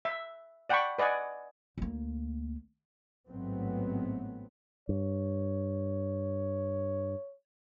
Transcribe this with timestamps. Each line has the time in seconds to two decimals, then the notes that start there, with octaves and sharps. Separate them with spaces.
0.05 E5
0.69 D5 F#5 G5 A5 B5 C#6
0.98 B4 D5 D#5 F#5 G#5
1.78 D2 A#3
3.29 A1 G#2 F#3 A3 B3 C4
4.89 G2 C#5